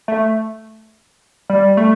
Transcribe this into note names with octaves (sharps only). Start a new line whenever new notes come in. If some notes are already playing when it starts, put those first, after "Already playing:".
A3
G3
A3